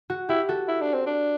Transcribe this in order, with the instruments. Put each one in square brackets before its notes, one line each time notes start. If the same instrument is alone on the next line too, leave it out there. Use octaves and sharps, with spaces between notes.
[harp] F#4
[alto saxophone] E4 [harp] G4
[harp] F#4 A4
[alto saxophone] E4
D4
C4
D4